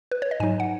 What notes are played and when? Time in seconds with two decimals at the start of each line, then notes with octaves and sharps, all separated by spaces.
0.11 B4
0.22 C#5
0.31 D#5
0.40 G#2 F#3 D#4 G#5
0.60 F#5